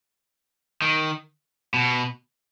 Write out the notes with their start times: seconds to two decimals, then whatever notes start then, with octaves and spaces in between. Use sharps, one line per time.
0.82 D#3
1.74 B2